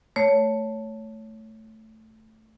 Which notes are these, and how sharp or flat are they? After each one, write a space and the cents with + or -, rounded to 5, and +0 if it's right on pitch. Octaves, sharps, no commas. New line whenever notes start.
A3 +0 C#5 +10